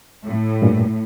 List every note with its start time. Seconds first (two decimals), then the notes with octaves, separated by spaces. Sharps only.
0.25 A2
0.62 G2 A#2